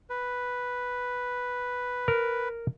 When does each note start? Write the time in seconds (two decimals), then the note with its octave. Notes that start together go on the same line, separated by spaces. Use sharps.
0.10 B4
2.08 A#4